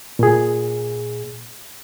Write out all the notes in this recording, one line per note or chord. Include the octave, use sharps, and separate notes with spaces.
A#2 G#4